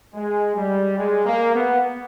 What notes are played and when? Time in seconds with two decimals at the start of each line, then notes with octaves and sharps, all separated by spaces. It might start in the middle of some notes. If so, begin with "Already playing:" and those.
0.13 G#3
0.55 G3
0.97 G#3
1.26 A#3
1.54 B3